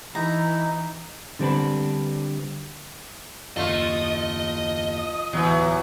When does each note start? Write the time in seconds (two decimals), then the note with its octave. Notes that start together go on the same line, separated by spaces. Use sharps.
0.15 E3 D#4 E4 A#5
1.39 D3 G3 C4 D4 B4
3.57 F#1 D#2 A3 F4 D#5
5.33 D1 E2 E3 F#3